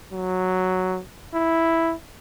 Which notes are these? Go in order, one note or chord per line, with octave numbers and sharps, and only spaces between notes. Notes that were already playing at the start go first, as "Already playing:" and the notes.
F#3
E4